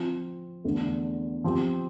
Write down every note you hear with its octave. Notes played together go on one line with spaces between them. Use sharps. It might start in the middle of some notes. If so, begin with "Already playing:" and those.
Already playing: F3 C4 F4
E2 D3 A3 D4
F3 C4 G4